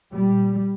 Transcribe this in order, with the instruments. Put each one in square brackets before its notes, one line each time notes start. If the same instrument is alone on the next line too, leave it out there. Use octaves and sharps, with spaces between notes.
[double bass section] A#2 G3